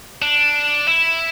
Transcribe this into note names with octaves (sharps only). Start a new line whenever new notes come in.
D4
E4